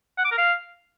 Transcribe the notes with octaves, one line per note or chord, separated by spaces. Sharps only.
F#5
D6
A#4
F5